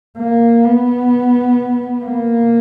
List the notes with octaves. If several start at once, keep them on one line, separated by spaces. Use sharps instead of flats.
A#3
B3
A#3